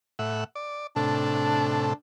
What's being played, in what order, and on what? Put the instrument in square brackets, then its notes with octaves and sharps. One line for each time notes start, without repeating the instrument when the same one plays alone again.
[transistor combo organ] A2 E5 F#5
D5
[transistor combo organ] A2 C3 A4 [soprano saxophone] D4